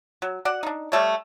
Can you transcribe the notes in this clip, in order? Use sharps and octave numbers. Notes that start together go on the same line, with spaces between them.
F#3
F#4 D5 F#5
D4 D#4
G3 A3 C#5